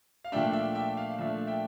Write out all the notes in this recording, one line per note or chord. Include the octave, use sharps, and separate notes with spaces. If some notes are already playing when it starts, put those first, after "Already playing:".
F5
A#2 F3 A3 D4 E5 G5
E5 G5
E5 G5
F5
A#2 F3 A3 D4 E5
E5 G5